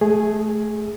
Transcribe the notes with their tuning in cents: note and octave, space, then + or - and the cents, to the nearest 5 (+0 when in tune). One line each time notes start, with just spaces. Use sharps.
A3 -25 G#4 +0